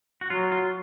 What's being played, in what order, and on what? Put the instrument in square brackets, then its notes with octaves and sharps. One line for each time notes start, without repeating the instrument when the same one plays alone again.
[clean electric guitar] F#4
[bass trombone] F#3 [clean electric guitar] F4
[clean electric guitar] F4